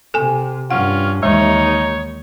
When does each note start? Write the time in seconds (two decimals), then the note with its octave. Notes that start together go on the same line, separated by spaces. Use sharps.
0.14 C3 A4 G#5
0.71 G2 C#4 F4 F#5
1.23 D#2 E3 G#3 D#4 C#5